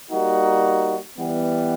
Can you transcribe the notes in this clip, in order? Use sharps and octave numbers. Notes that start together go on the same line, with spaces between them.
G3 A#3 D#4 F#4
E3 G3 B3